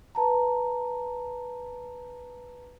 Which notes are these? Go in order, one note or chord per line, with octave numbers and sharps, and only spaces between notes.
B4 A5 A#5